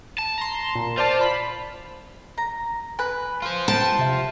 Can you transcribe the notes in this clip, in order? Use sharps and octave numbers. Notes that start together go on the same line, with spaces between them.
A5
A#5 C6
A#2
F4 C5 D5 A5
B5 B6
A#5
B4 G#5 B5 F#6
F4 C5
G5 A5
C3 E5